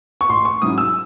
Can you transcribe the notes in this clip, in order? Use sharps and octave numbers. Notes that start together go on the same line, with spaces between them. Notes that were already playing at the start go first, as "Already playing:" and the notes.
C#6
A1 C6
C#6
G#2 F#3 C#4 E4 D#6
E6